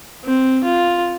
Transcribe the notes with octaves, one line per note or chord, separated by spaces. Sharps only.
C4
F4